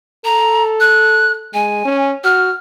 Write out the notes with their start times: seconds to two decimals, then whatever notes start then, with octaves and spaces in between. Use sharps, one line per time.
0.25 A4 A#5
0.80 F#6
1.54 G#3 G#5
1.85 C#4
2.24 F#4 F6